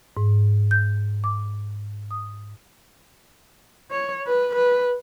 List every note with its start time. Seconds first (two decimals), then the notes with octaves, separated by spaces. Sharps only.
0.17 G#2
0.71 G6
1.24 D6
2.11 D#6
3.91 C#5
4.26 B4
4.55 B4